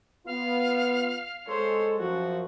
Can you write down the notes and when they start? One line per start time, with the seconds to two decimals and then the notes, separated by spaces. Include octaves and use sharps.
0.26 B3 F4 F5
1.47 G#3 A4 C5 C#5
1.98 F#2 F3 F#4